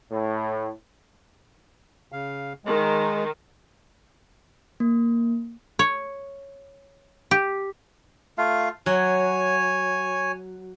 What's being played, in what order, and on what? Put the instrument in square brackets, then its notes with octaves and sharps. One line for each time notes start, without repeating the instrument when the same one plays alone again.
[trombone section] A2
[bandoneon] C#3 F5
[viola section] D#3 [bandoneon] G#3
[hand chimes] A#3
[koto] C#5
G4
[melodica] A3 F4 F5
[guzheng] F#3 [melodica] C#5 G#5